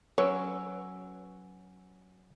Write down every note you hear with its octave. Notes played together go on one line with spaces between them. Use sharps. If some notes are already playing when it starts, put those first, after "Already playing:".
F#3 C#4 B4 C#5 E6 D7